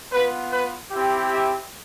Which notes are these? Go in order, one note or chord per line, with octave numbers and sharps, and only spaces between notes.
B3 F4 B4
B4
C4 E4 G4
E5